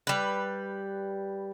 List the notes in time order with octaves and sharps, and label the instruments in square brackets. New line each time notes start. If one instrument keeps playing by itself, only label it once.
[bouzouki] G3 B4